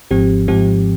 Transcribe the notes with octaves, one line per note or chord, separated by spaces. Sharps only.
G#1 G#2 F3 C4 G4
G#1 G#2 F3 C4 G4